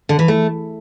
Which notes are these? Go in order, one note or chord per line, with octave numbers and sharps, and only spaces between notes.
D3
E3
A3